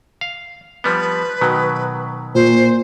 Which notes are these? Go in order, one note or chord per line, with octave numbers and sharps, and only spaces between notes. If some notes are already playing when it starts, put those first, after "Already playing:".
F5
F3 G3 B3 B4
B2 D#3 F#3
A#2 C5